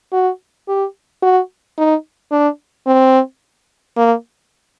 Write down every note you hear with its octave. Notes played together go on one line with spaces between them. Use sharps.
F#4
G4
F#4
D#4
D4
C4
A#3